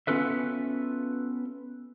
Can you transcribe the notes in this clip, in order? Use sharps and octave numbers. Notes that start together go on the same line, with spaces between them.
B3 C#4 F4 A4 B4 E5